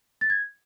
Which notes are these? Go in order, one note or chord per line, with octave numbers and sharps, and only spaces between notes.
A6
G#6